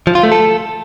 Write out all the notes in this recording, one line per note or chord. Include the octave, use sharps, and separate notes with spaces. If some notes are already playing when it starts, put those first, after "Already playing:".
F3
F4
A3
A4